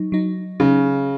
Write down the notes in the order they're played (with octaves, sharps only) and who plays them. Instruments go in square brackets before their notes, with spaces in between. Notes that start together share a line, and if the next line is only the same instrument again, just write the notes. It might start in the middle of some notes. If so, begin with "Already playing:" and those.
Already playing: [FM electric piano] F#3 D#4
F#3 D#4
[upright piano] C#3 [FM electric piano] F#3 D#4